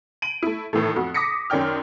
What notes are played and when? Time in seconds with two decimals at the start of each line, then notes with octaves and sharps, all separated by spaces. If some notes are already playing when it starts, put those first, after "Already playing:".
0.22 D7 D#7 F#7
0.43 A3 E4
0.73 A2 D#3 E3 A3
0.96 F2 F#4
1.14 D6 D#6 A#6 B6 C#7
1.50 F#2 D#3 C#4 D5 G5 F6